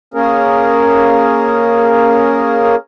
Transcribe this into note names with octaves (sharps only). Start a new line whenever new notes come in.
A#3 C#4 G#4 A#4